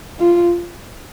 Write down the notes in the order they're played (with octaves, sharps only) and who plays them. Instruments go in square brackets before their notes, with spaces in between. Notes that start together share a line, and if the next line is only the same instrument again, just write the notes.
[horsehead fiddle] F4